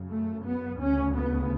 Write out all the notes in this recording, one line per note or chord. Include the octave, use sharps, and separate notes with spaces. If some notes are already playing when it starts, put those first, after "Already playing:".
Already playing: F#2 C#3
A3
B3
D2 C#3 C#4
B3